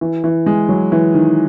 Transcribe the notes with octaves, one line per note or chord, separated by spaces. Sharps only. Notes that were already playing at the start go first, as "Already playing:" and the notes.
E3
E3
G#3
F#3
E3
D#3